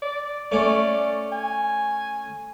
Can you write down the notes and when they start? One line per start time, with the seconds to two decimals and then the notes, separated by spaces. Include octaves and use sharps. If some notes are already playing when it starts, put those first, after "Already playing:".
0.02 D5
0.52 A3 C#4 D5
1.32 G#5